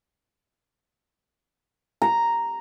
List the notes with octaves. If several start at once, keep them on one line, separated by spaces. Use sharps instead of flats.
A#5